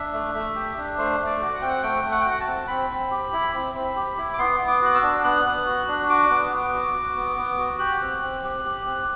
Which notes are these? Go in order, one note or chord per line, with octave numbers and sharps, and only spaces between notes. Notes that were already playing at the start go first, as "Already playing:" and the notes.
Already playing: D4 E5
A3
A3
G4
D4
A3 C5
A3
D5
F#4
F#5
C4 G5
F#5
A3 G5
A3
F#5
G5
F#4 F#5
A5
C4
C4 B5
C4
G4
E4
C4
C4
G4
E4
D6
B3 C6
B3
D6
F#4 F#6
E6
D4
B3 F#6
B3
F#4
D4
F#4 D6
B3
B3
F#4
F#4
B3
B3
F#4
G4 F#6
C4
C4
G4
G4
C4